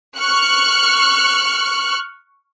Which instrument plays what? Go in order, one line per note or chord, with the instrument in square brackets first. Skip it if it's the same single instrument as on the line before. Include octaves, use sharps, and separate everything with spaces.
[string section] C#6 F6 F#6 C#7